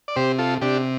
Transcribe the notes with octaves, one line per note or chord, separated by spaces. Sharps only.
D5
C3 G4 C5
F4 A4
C3 D4 G4